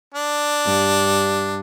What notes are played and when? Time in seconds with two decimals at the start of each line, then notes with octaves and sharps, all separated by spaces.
0.14 D4
0.65 G2